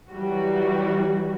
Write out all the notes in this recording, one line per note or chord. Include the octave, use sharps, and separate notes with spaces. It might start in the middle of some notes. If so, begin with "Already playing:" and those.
E3 F#3 G3 F#4